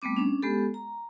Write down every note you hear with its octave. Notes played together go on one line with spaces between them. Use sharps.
G3 A3 B3 C4 D6
C#4 D4
G#3 B3 G4 A4
A#5